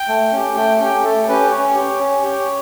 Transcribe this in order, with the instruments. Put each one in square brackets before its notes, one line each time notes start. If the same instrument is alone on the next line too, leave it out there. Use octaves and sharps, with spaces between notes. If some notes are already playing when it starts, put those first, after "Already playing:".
Already playing: [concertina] G5
A3
C#4 G4
A3 G5
C#4 G4 G5
A3 A4
C#4 G4 B4
C#4 C#5
G4
C#4
G4